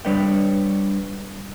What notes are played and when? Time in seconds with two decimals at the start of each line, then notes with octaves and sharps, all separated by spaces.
0.05 G3 D4 B4 C#5 D5 G5